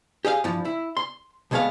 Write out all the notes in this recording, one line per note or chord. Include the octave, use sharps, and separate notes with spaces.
G4 G#4 D#5 F5
G2 E3 F3
E4
C6
C2 C3 G#3 A3 B3 F5